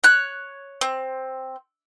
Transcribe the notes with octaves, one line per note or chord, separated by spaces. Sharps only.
C#5 F#6
C4